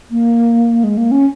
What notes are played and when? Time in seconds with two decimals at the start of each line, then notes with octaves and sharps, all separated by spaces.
0.11 A#3
0.84 G#3
0.97 A#3
1.11 C#4